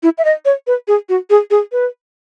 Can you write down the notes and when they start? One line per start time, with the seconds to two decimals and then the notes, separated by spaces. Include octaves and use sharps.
0.03 E4
0.18 E5
0.25 D#5
0.45 C#5
0.67 B4
0.88 G#4
1.09 F#4
1.30 G#4
1.51 G#4
1.72 B4